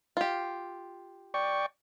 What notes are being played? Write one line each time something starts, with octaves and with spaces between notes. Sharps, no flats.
F4 G4
D5 G5 C#6